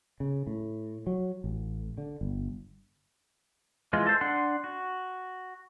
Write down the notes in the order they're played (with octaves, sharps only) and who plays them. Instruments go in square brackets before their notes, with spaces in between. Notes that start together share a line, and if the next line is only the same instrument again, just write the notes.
[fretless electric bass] C#3
A2
F#3
A1
D3
G1
[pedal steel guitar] E3 G#3 F4
A4 C5
D4 F#5 C6
F#4